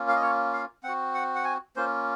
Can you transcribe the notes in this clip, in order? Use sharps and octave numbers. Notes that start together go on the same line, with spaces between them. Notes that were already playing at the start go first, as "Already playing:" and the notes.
Already playing: A#3 C#4 F4
F5
D#5
C#5
F5
C4 F#4 F#5
F#5
F#5
G#5
A#3 C#4 F4 C5